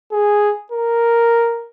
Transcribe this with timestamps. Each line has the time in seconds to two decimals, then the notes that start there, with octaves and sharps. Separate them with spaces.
0.12 G#4
0.72 A#4